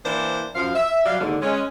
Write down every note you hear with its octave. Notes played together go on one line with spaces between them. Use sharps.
E3 A#3 C4 D4 C5
F#2 F3 F5
E5
F#3 G3 D5 F5
D#2 G#2 D3
G#3 C#4